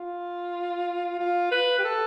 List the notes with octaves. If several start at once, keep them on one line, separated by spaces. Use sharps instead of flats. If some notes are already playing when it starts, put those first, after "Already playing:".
Already playing: F4
F4
B4
G4
A4